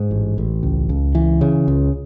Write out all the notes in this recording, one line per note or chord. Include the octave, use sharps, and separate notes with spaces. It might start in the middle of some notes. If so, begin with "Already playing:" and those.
Already playing: G#2
A1
A1
C#2
C#2
E3
C#3
C#2